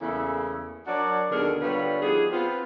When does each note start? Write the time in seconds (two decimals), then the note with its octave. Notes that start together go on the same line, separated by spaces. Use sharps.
0.01 E2 C#3 A3 A#3 E4 A4
0.87 F#3 D4 F#4 A#4 C#5 D5
1.31 D#2 B2 D3 D4 G#4 A#4
1.61 D3 G3 B3 F4 B4 C#5
2.02 F3 B3 D#4 G4 G#4
2.32 B3 C4 F4